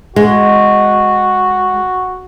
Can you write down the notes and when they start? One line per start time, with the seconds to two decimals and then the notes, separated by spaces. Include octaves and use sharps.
0.16 G#3 F#4